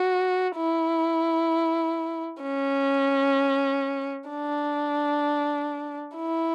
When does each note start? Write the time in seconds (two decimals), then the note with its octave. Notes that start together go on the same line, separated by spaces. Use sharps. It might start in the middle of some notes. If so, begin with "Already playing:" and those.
Already playing: F#4
0.56 E4
2.43 C#4
4.29 D4
6.16 E4